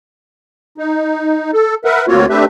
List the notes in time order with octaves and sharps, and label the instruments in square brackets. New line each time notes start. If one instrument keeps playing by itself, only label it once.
[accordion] D#4
A4
A#4 B4 E5 F#5
D2 A#3 C4 F4 F#4 C#5
A3 C4 D4 G4 B4 E5